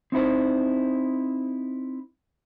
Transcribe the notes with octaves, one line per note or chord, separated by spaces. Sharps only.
C4 D#4 E4 C5